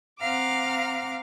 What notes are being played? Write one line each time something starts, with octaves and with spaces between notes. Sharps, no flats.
C4 F5 F#5 A#5 D6 F6